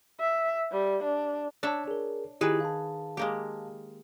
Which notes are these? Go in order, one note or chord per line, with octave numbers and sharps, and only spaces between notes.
E5
G3
D4
D4 C#5 D5 E5 A5
G#4 A#4
D#3 E4 F4 G4 G#4 B4
F5 A5
G#3 A#3 G4